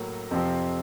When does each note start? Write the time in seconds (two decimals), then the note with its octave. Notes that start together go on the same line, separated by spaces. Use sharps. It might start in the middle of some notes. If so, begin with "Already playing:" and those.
Already playing: A2 F#3 A#3 A#4
0.31 F2 C3 F3 C4